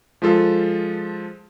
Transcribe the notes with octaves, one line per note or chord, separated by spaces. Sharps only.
F3 G#3 F4 A4